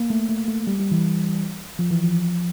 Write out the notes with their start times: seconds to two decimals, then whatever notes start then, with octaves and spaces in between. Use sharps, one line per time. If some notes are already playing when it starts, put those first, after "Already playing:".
Already playing: A#3
0.10 A3
0.29 A3
0.48 A3
0.67 G3
0.79 G3
0.91 E3
1.79 F3
1.91 E3
2.04 F3